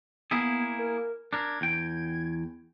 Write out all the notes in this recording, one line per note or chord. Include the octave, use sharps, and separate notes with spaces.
A#3 B3 E4 G#4
A#4
D4 A#4 G#6
E2 G5